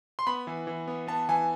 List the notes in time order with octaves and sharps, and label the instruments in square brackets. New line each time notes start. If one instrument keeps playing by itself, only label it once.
[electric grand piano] C6
B3 B5
E3
E3
B3
B3 A5
E3 G#5